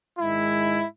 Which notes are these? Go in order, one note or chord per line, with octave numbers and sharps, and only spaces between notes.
G#2 D#3 G#3 E4